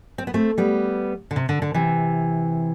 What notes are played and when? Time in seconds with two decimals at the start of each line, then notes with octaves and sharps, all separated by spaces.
0.18 C4
0.27 B3
0.34 A3 C4
0.58 G3 B3
1.31 D3
1.36 C3
1.49 D3
1.62 D3
1.74 C3 E3